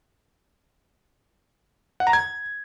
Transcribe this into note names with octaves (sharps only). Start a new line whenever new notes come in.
F#5
A#5
G#6